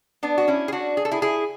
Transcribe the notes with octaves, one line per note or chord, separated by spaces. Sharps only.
B3 D4
F#4
C#4 E4
G#4
D4 F#4
G#4
A4
E4 G#4
E4 G#4